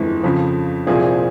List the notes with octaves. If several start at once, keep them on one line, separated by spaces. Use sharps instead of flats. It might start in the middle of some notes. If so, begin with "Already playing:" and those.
Already playing: G1 F2 E3 G#3
F2 C#3 F3
C2 A#2 F3 C4 G#4